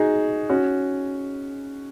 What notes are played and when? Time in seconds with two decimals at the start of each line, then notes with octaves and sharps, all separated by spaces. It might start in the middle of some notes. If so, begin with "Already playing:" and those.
Already playing: D#4 F#4 G#4
0.50 C#4 F#4